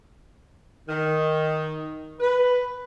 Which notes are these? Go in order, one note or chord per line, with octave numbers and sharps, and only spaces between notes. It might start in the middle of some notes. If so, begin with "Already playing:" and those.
D#3
B4